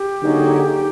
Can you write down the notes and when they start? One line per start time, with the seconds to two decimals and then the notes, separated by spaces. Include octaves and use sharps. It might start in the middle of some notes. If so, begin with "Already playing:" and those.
Already playing: G4
0.20 D3 F#3 A#3 D#4 G#4